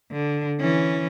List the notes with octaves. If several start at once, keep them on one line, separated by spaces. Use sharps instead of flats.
D3
E3 C#4